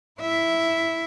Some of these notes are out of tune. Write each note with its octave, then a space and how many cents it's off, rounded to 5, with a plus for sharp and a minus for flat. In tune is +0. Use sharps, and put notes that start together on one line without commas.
E4 +0 E5 +0